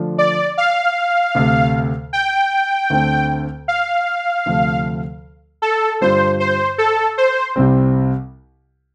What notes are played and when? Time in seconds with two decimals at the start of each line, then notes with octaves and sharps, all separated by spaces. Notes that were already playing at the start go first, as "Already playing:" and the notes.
Already playing: D3 F3 A3 D4 F4
0.18 D5
0.58 F5
1.35 D2 C3 A3
2.13 G5
2.90 D2 D3 A3 C4
3.68 F5
4.46 D2 C3 F3 A3
5.62 A4
6.01 G2 D3 G3 F4 C5
6.40 C5
6.78 A4
7.18 C5
7.56 C2 C3 G3 C4